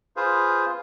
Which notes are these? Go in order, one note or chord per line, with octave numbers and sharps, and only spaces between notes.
F4 G#4 B4 C5 F5